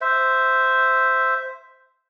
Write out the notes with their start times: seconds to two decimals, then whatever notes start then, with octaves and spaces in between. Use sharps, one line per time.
0.01 C5 E5